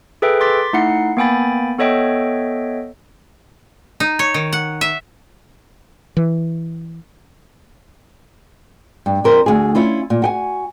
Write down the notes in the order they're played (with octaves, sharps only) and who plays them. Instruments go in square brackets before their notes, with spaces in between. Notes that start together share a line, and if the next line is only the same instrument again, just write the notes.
[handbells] G#4 A4 B4 E5 G5
C6 D6 A6 B6
A3 D#4 E4 F#5 C7 C#7
A#3 B3 G5 G#5 B5 A6
B3 A4 C#5 D#5 E5 G5
[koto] D#4
C#5
D#3
F#5
E5
[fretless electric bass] E3
[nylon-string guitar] G2
F2 A#4 C5
D2 G#4
C#4 E4 F4
A#2
F#4 G5 G#5